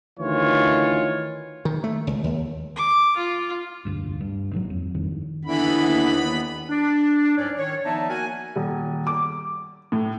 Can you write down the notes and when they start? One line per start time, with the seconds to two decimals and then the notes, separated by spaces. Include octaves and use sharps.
0.20 D2 D#3 E3 F4 C#5
1.65 D#3
1.84 A3
2.07 C#2
2.24 D#2
2.76 D6
3.17 F4
3.85 F1 D2 G2
4.20 G2
4.52 G#1 G#2 C3 F#3
4.70 F2
4.94 G#1 F2 D#3 G3
5.45 D#2 D3 E3 B3 B5
6.69 D4
7.37 C2 G#2 F#3 C#4 C#5 D5
7.57 D#3 C#5
7.85 F3 B3 D#4 D5 E5 A5
8.09 A#3 F#4 A#4 F#5 G#5
8.56 D#1
9.07 D6
9.92 A2